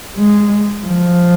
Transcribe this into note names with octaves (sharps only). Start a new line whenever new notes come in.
G#3
F3